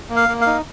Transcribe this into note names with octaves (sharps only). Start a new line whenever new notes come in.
A#3
F5
A#3
F5
D#4